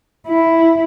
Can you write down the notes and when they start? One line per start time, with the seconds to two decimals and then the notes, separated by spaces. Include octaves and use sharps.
0.28 E4